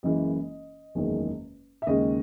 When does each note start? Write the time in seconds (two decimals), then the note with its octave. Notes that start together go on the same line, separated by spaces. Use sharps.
0.03 F#1 F#2 E3 G#3 D#5
0.95 F#1 E2 D#3 G#3
1.82 E5
1.87 D#2 C#3 G#3 D#5